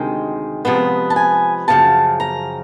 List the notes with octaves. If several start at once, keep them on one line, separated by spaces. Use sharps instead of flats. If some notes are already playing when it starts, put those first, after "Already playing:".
Already playing: D2 C3 D#3 G#3 G5
C3 F3 G#3 B3
A5
G#5
F#2 C#3 F3 A5
A#5